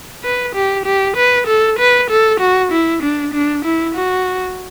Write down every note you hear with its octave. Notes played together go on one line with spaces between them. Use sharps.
B4
G4
G4
B4
A4
B4
A4
F#4
E4
D4
D4
E4
F#4